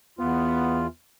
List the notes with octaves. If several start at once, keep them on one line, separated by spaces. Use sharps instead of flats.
E2 B3 F4